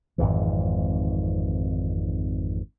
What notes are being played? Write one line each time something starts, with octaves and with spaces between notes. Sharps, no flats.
G#1 F2 G#2 E3